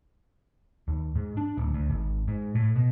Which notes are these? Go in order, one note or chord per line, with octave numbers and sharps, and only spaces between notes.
D#2
G#2
D4
D1
D2
G#1
G#2
A2
B2